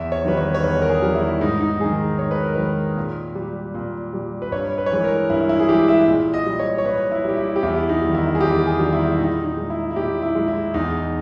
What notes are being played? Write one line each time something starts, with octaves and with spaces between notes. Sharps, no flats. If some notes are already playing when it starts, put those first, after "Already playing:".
Already playing: E2 E5
C#5
D#3 G3 B4
C#5
C#5
E2 B4
A#4
G#4
D#3 G3
E4
G#2 D#4
D#4
D#3 G#3 G#4
G#2 C#5
B4
A#4
D#3 G#3 B4
A#2
G3
A#2
G3
B4
G2 C#5
B4
C#5
E3 G#3 B4
A#4
G2 E4
E4
G#4
E3 G#3 G4
E5
A#2
D#5
G3
C#5
C#5
A#2 B4
E4
G3 G4
E4
G4
E2 E4
D#4
D#3 G3
E4
G#4
E2 G4
G#4
D#3 G3
E4
E4
A#2 D#4
D#4
G#3
E4
E4
A#2 G4
E4
G#3
E4
E2 D#4